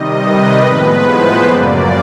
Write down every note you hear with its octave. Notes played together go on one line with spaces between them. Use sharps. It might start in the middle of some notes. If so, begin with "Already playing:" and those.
Already playing: C3 D#3 G3 D#5
B4
A2 F3 G#3 B3 B4
C5
F#2 C#3 F#3 A#3 D5